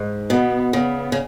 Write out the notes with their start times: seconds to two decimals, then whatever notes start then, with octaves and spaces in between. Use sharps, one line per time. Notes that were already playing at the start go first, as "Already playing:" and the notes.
Already playing: G#2
0.30 B2 B3
0.73 C#3 B3
1.12 C#3